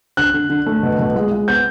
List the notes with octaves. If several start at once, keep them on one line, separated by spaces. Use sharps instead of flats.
D3 F#6
D3
D3
A3
B2
B2
G#3
G#3
B3 G6